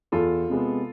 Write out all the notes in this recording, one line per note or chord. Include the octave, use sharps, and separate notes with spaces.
E2 F4 A4
C3 G#3 B3